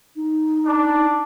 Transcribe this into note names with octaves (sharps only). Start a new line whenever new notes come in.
D#4
D4